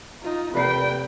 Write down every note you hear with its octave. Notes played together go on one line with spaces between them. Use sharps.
D#4 F4
F1 A#3 B4 D5 G5 C7